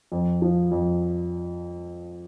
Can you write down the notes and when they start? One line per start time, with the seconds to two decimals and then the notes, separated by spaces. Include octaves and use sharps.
0.12 F2
0.42 F3
0.72 F2